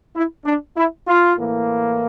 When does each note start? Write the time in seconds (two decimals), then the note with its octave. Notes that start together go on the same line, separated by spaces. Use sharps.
0.15 E4
0.45 D4
0.76 E4
1.07 F4
1.37 A2 E3 A#3